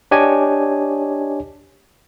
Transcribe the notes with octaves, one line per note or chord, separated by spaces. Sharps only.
D4 G4 C#5 D#5 G#5